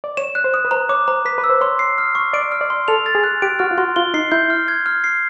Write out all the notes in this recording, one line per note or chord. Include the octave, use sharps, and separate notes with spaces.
D5
C#5 E7
F#6
C5
D#6
B4
C5 A#5
C#5 D6
C5 A#5
B4 B6
B4
E6
C5
C#5 C6
C7
F6
C#6
D5 D7
F6
D5
C6
A4 F7
A6
G#4
F#6
G4 D7
F#4 F6
F4
F#4 C6
F4 G7
D#4 C7
E4 G6
F6
G#6
F6
C7